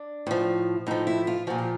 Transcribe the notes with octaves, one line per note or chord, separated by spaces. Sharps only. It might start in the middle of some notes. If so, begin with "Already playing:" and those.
Already playing: D4
A2 F3
A2 F3 D#4
E4
F4
A#2 F3 F#4
G4